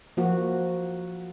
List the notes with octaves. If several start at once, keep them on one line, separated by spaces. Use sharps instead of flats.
F3 A#3 F#4